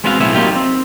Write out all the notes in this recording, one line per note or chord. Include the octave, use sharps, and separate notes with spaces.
G#3 B3 C4 E4 F#4 F5
B1 A2 B3 C4 G#4 E5
F#3 A#3 C#4 D#4 F4 G4
C4